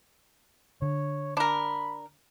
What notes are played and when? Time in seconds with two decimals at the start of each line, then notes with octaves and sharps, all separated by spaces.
0.82 D3 C#5
1.37 D4 A#4 B5